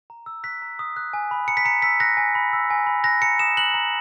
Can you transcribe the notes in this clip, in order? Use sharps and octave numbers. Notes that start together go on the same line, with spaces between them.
A#5
E6
F#6 B6
A#5
D#6
F#6
G#5
B5
A#5 C#7
B6
A#5 C#7
E6 B6
F#6 A#6
G#5
B5
E6
G#5
B5
F#6 A#6
A#5 C#7
D#6 E7
F#6 F#7
A#5